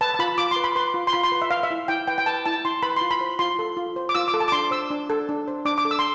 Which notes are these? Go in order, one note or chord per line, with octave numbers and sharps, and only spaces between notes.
B4 A5
A5
F4 B5
F4 D6
C6
B4
B5
B4 C6
F4
C6
F4 B5
C6
B4
E5
B4 F5
E5
E4
E4 G5
B4 G5
G5
B4 A5
E4 A5
E4 C6
B4 B5
F4 C6
B5
C5
F4 C6
A4
F4
C5
D6
F4 E6
D6
A4
A5
D6
D4 C6
C5 E6
D4
A4
D4
C5
D4 D6
D6
A4
E6
C6